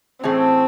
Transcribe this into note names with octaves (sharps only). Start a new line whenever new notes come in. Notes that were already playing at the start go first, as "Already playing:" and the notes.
A2 E3 A3 C4 C#4 G#4